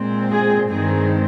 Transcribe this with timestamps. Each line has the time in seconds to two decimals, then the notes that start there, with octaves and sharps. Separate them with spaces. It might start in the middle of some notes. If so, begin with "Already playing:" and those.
Already playing: A#2 G#3 C4
0.31 G#4
0.70 G2 D#3 G#3 C4 G#4